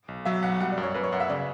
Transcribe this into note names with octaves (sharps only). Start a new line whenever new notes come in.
B1
F#3 E5
B1 F#5
G3 F#5
D5
F#2
C#5
F#2 B4
C#5
F#2 F#5
E5
C#3 D5